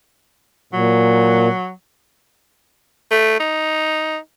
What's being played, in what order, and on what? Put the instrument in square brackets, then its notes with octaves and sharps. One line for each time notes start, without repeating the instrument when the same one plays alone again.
[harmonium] A#2 [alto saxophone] F#3
[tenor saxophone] A3
D#4